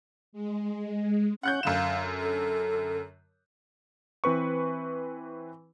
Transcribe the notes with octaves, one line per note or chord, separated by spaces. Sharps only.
G#3
C#4 F#5 F#6 G6
F#2 D3 F5 E7
A4
E3 C4 B4 C#6